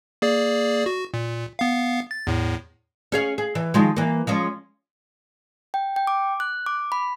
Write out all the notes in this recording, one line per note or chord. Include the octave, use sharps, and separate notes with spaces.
A#3 G#4 D5
F#4
A#2
B3 F5
A6
E2 A2
C#4 G#4 F5
G#4
E3
D#3 F3 G#3
E3 A#3
F3 G#3 C#4
G5
G5
D6
F#6
D6
B5